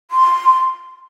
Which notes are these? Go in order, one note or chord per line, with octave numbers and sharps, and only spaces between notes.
C6